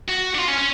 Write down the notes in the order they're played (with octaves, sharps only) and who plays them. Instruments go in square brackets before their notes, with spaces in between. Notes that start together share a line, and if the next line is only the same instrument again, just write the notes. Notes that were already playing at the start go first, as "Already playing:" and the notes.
[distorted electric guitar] F#4
D4
F4
C#4
C#4